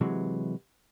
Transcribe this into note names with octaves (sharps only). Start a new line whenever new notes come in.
C3 E3 F#3 G#3